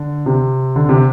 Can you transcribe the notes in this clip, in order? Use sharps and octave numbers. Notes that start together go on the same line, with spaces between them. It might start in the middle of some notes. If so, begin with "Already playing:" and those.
Already playing: D3
C3
D3
C3